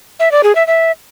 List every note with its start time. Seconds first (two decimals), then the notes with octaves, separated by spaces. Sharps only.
0.20 E5
0.32 D5
0.43 G#4
0.55 E5
0.67 E5